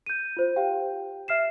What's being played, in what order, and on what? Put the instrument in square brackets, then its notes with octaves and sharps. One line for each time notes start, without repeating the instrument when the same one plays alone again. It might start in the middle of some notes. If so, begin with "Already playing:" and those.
[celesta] G6 D#7
F4 C5
G4 F5 G5
E5 F6 C7 E7